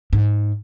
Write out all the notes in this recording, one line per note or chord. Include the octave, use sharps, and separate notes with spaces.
G#2